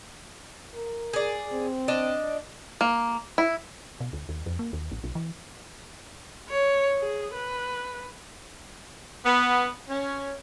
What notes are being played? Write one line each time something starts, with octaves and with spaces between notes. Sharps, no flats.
A#4
G#4 D5
C4
D4 D5 D#5
A#3
E4
B2
D2
D#2
F2
A#3
D#2
A1
B1
E3
C#5
G#4
B4
B3
C#4